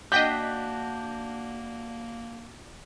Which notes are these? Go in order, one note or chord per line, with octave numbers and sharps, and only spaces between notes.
A#3 D4 F#4 D#5 G5 G6 B6